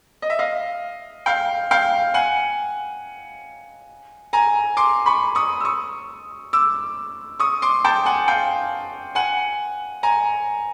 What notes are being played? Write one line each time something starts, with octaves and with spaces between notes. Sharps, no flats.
D#5
E5
D#5 F5
F5 G5
F5 G5
F#5 G#5
G#5 A#5
C6 D6
B5 C#6
C#6 D#6
E6
C#6 D#6
D6 E6
C#6 D#6
C6 D6
G5 A5
F#5 G#5
F5 G5
F#5 G#5
G#5 A#5